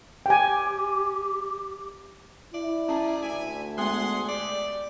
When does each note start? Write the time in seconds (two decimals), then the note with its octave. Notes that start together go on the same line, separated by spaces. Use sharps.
0.26 G4 G5 G#5
2.54 E4 D5
2.88 G3 C#4 G#4 A5 A#5
3.22 D2 E5 G#5
3.78 G#3 B3 G#4 F#5 C6
4.29 A3 G4 D5